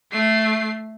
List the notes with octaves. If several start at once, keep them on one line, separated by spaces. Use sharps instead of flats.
A3 C7